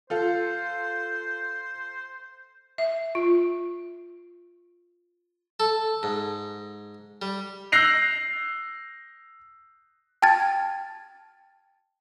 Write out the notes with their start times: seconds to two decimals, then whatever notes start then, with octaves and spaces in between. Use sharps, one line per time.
0.10 F4 A4 C5 F5
2.78 E5
3.15 F4
5.60 A4
6.03 G#2
7.22 G3
7.72 E6 F#6 G6 A#6 C7 F7
10.22 G5 A5 F6 G#6 A6